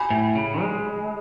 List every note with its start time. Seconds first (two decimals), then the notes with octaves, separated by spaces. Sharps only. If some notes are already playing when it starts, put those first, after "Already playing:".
Already playing: G#5 B5
0.10 A2
0.35 C#3
0.62 G#3